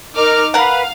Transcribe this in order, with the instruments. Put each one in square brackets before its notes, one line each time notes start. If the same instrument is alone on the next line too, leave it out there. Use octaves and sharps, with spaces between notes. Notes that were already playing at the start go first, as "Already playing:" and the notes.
[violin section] D#4 D6 F6 [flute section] A#4
[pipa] A#4 F#5 [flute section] B4 B5 [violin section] F5